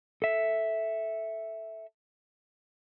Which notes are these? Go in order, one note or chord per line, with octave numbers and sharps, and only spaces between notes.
A4 E5